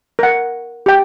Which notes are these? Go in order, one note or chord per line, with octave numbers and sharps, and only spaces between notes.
A#4 F#5
G4 G5